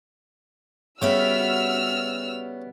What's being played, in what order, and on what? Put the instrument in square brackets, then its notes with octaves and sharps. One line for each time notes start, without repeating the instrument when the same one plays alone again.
[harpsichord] C#3 [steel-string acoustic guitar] G3 B3 E5 [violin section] F#4 E6 F6